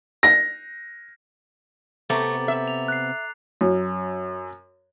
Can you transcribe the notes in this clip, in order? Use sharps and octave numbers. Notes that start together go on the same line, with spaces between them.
A#6
C3 A3 B3 C4 A#5 D6 A6
E5
F7
F#6 C7
F#2